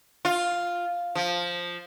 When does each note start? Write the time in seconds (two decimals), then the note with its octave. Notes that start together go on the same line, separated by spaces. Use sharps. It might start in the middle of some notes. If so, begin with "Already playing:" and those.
0.25 F4
1.15 F3